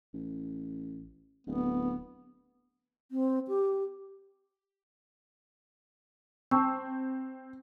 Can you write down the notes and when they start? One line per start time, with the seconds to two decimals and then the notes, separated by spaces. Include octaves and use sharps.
0.14 A1
1.47 D1 B3
3.12 C4
3.48 G4
6.51 C4 A5 C#6 E6